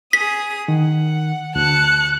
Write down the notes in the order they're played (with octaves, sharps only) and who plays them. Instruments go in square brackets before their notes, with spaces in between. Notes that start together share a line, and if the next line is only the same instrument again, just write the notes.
[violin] G#4 D#6 [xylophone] B6
[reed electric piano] D#3 [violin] F#5
[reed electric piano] D2 [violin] A5 C#7 [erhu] F#6